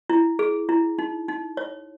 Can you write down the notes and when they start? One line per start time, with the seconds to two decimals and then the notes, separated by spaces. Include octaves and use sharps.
0.10 E4
0.39 G#4
0.69 E4
0.99 D#4
1.28 D#4
1.57 C#5